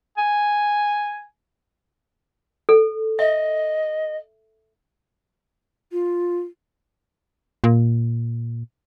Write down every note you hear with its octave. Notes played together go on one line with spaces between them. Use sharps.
G#5
A4
D#5 E5
F4
A#2